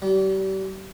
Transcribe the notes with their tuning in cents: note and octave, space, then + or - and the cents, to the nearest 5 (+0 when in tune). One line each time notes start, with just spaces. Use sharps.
G3 -35